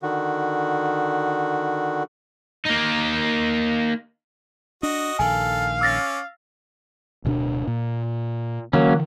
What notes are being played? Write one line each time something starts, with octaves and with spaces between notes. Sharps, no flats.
D3 D#3 F#4
A#3 D#4
D4 F#4 D#5
A#1 D#3 A4 F5 G#5
C#4 D6 E6 A6 A#6
D1 B2 D4
A#2
D3 E3 F#3 A#3 C#4